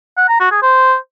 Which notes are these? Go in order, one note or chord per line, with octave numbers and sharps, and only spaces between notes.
F#5
A#5
F#4
G#4
C5